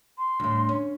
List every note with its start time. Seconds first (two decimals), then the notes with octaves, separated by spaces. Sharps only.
0.18 C6
0.40 D2 A2
0.69 C#4